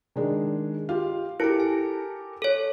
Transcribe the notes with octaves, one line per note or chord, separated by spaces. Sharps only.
D#3 G#3 D4
F4 G4 F5
E4 G4 A4 A#4 A5 D7
G#5
A4 C#5